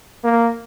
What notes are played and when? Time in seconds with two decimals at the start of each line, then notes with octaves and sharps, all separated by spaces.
0.23 A#3